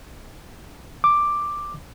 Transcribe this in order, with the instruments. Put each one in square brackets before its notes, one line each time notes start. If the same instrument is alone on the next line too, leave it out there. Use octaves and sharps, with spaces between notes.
[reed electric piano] D6